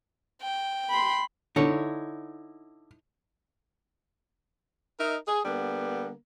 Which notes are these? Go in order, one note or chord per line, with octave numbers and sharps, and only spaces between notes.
G5
B5 C6
D3 D#4 E4 C#5
D#4 A#4 D#5 E5
G#4
D3 G3 A#3 B3